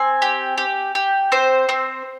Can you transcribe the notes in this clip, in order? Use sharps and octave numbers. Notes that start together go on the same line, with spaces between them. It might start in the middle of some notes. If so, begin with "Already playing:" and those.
Already playing: C4 G#5
G4
G4
G4
C4 C5
C4